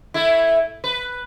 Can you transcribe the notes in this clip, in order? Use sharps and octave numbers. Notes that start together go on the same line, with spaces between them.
A3 E4
B4